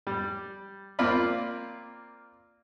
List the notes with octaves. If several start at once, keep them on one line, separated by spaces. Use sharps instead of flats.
G3
A#3 C4 F4 D5 B5